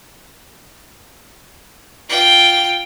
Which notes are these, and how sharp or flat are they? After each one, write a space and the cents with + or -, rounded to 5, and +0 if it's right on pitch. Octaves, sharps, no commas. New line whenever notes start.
F4 +0 G5 +0